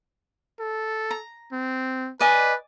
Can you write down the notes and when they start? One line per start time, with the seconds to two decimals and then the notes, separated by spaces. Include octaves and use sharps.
0.59 A4
1.11 A#5
1.52 C4
2.20 B4 D5 D#5 G#5